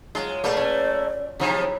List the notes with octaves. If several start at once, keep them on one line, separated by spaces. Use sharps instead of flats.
F#3 G#3 F4
B2 A3 A#3 D5
C#4
C3 F3 F#3 G#3 D#4 E4